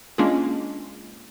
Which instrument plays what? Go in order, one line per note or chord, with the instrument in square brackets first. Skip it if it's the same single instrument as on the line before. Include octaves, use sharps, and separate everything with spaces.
[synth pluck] G#3 A#3 C#4 D4 F4 G#4